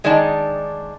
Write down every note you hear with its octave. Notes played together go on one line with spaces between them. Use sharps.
D#3 G#3 D4 D#4 D5 A5